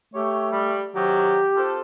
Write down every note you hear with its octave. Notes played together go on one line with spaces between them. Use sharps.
A3 G4 C#5
G3
C3 D#3 F#3 G4
C4 F4 A4